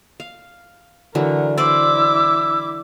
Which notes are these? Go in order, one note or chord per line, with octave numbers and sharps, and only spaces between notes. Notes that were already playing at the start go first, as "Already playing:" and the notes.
F5
D3 E3 F#3 A#4
E4 C5 D5 D6 E6